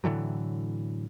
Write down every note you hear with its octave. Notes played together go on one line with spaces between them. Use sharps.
A2 D3 E3 F#3